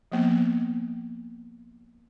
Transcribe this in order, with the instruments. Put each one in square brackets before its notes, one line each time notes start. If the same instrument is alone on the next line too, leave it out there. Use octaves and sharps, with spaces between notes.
[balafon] F3 A#3 B3